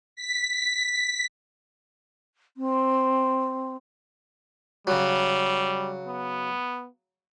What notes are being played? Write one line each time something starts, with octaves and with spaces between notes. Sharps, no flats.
B6
C4
C#3 F#3 G3
B3